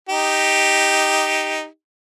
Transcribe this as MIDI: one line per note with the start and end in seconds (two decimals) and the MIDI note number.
0.09 1.65 63
0.09 1.65 67